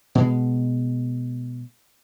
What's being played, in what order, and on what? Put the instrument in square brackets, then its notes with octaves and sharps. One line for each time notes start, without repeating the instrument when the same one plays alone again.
[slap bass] B2 G#3